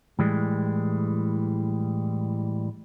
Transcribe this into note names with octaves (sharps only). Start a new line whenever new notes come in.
A2 E3 G3 G#3